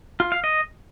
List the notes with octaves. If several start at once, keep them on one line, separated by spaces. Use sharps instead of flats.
F4
F5
D#5